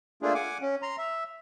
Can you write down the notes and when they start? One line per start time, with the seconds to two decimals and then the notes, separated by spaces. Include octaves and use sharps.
0.23 A3 A#3 D4 F4 G#4
0.35 F#5 G#5 D6
0.61 C#4
0.82 A#5 C6
0.98 E5